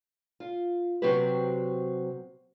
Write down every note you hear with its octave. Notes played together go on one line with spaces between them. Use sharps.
F4
C3 F#3 C4 F#4 G4 B4